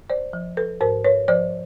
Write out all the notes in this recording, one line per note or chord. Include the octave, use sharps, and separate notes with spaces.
C5 D5
F3
A4 B4
G#2 A#4 C5
B4 C#5
F3 C5 D5